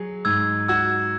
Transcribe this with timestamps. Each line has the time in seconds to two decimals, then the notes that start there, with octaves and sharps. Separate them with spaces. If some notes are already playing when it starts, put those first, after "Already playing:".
Already playing: F#3 G#4
0.25 G#2 E6 G#6
0.68 F#4 E6 G#6